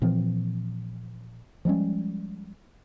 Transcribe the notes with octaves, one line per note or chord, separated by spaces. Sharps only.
A#2 E3 F3 C4
F3 G3 G#3 C#4